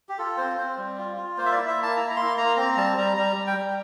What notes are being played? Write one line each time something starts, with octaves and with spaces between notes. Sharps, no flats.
G4
F4 A4
C4 C5
C4 C5
G3
F4
F4
A#3 C5
E5
D5
E4
E5
A#3 A5
E4 A#5
A#5
A#3 C6
A#3 A#5
C4 A#5
G3 A5
G3 A#5
G3 A#5
G3
G5
G3